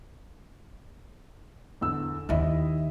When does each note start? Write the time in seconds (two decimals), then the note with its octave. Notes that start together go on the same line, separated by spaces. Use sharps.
1.81 E2 D3 E6
2.29 D#2 D#3 E4 D#5 E5